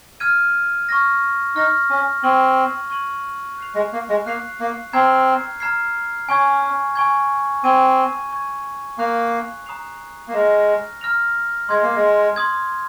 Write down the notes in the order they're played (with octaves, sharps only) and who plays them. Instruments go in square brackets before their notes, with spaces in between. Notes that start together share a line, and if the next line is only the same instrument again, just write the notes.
[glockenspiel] F6 G#6 D#7
C#6 F6 A#6
[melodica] D#4 [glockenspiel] C#6 F6 A#6
[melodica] C#4
[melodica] C4 [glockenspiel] C#6 G#6 D#7 F#7
[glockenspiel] C#6 G#6 D#7 F#7
F#6 C7 F7
[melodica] G#3
A#3
G#3
[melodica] A#3 [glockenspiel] F#6 C7 F7
[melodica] A#3
[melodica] C4 [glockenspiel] A#5 F6 G#6 C7
[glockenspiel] A#5 F6 G#6 C7
[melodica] C#4 [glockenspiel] G#5 C#6 G#6
[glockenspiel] G#5 C#6 G#6
[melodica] C4 [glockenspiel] C#6 G#6 D#7
[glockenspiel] C#6 G#6 D#7
[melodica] A#3 [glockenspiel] A#5 D#6 F#6 C7 F7
[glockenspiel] A#5 D#6 F#6 C7 F7
[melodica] A#3
[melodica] G#3 [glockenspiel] A#5 F6 A#6 F7
[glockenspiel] A#5 F6 A#6 F7
[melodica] G#3 [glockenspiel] C6 D#6 G#6
[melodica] A#3
G#3
[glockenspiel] C6 D#6 G#6